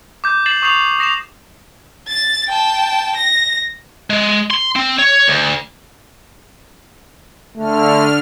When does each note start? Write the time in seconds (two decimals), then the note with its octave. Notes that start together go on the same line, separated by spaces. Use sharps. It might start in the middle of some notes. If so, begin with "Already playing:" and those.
0.24 D6 G6
0.46 A6 C7 E7 F#7
0.62 C#6 D#6 G6 C7 F7 F#7
0.99 D#6 A#6 C7 E7 F7
2.08 A6
2.48 G5 A5
3.17 A#6
4.10 G#3
4.51 C6
4.76 C4
4.99 C#5
5.28 D2
7.57 D3 A3 F6